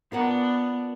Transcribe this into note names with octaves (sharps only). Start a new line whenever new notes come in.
B3 D4 F4 A#4 F#5